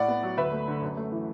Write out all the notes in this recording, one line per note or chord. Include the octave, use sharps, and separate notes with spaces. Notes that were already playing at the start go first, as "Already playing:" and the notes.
Already playing: A2 D5 F#5
B3
F#3
D2 B4 E5
A3
D3
F#2
A3
E3